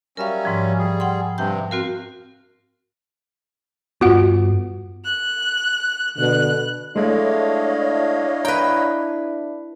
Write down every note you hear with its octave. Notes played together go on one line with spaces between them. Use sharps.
F#3 G3 C#4 A#4 E5 F5
G#2 F3
G3 G#4
F#5 G5 C6
G2 C3 G5 G6
C4 F#4 A#4 F5
G2 B3 F4 F#4 F#5
F#6
B2 D3 F#6
G#3 A3 D4 E4 C#5 D#5 F5
B4 G5 A#5